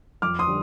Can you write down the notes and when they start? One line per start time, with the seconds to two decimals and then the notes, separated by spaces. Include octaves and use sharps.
0.22 F2 D6 F6
0.39 C6 D#6
0.47 D3 G3